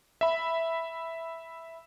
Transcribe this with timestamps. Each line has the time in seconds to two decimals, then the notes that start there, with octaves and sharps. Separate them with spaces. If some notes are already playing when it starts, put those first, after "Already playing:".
0.21 E5 B5